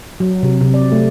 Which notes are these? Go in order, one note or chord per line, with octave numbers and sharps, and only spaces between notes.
F#3
C3
C3
D5
A3